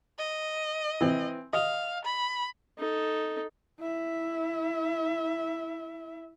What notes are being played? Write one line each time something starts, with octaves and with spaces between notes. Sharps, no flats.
D#5
E3 C4
D#5 F5
B5
D#4 A4
E4 E5